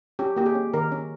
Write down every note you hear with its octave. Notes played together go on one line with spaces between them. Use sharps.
C#4 G4
A#3 G4
G#4
C#4
D#3 A#4
C#4